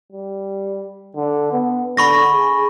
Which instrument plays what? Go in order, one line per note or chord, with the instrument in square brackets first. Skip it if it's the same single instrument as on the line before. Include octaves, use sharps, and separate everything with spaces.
[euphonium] G3
D3
B3
[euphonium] D3 [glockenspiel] B5 C#6 A#6
[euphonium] G#4